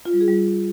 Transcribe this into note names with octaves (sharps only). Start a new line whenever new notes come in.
F4
G3
G#4
G3